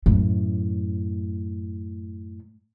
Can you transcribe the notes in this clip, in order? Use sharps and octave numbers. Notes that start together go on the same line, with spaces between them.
F#2 A2